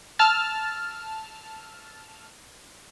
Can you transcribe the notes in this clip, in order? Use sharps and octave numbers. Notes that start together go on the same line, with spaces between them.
A5 E6 F6 A6